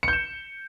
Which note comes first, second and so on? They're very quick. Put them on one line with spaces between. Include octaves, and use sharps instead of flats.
C#7 G6 E7